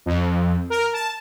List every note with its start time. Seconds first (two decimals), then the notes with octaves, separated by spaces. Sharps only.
0.06 F2
0.70 A#4
0.93 A5